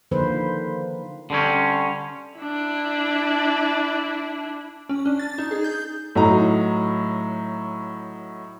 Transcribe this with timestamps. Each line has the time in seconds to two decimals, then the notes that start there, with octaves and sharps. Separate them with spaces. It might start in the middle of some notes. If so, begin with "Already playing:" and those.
0.11 D3 D#3 F3 A#3 B4 C5
1.30 D3 G3 C4 C#4
2.38 D4 E4
4.89 C#4
5.06 D4
5.19 A6
5.38 D#4
5.51 G#4
5.64 G6
6.15 A2 F#3 D#4 A#5